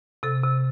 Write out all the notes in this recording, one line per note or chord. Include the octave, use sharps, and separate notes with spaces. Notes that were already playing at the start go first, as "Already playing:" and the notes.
C3 A4
C3